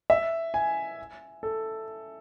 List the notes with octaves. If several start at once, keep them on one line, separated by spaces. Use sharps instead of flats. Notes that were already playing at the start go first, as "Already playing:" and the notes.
E5
G#5
A4